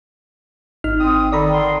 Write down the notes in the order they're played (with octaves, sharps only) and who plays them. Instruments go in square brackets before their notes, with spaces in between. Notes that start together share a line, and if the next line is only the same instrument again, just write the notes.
[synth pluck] G#1 D#4 F6
[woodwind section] C4 D#6
[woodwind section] D#3 A4 [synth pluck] D5 A#5 B5
[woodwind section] D3 D#3 C6